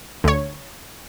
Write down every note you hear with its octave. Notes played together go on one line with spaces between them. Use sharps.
D2 C#5